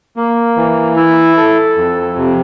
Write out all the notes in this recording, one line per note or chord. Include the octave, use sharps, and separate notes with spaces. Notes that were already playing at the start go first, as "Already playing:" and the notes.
A#3
E3
E4
A4
F2
C3